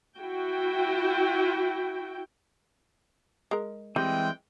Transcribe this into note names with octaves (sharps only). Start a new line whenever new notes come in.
E4 F#4 G5
G#3 A#4
E3 G3 G#3 C4 G5